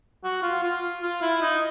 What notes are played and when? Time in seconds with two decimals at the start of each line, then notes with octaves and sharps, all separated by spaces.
0.24 F#4
0.43 F4
0.63 F4
1.03 F4
1.22 E4
1.42 D#4